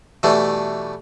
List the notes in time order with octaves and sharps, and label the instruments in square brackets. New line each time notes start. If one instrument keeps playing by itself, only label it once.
[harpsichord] B2 E3 G3 A3